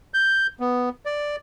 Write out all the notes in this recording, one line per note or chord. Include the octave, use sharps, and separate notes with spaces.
G6
B3
D5